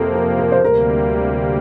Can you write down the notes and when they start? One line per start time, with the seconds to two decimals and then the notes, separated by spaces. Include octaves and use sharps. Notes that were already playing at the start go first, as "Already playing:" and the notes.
Already playing: F2 C3 F3 A#3 G4 A4
0.15 A#4
0.39 A#4
0.52 C5
0.62 D2 C3 G3 A#3 A#4